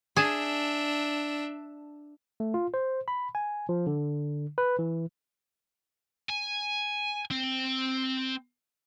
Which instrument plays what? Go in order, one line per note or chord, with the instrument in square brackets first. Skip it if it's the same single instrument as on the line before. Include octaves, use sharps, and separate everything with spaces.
[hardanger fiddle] D4 E5 [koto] G#4 A5
[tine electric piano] A3
F4
C5
B5
G#5
F3
D3
B4
E3
[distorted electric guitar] G#5
C4